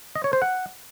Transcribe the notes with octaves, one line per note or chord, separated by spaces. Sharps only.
D#5
C#5
C5
F#5